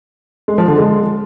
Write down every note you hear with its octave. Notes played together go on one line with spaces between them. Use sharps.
G#3
F3
D3
G#3